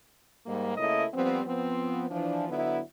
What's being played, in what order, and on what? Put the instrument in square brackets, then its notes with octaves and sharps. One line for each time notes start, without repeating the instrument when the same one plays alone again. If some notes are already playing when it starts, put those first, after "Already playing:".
[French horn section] G#2 G3 A#3
C#3 A3 A#3 E4 A#4 D#5
F3 G3 B3 C4
F3 B3 C4
E3 F3 D4
D3 F#3 B3 E4